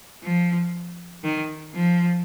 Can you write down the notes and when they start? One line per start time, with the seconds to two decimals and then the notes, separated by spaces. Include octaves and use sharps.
0.23 F3
1.24 D#3
1.74 F3